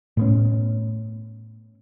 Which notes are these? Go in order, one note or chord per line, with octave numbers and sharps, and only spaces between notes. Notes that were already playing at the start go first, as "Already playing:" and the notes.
A2 B3 C#4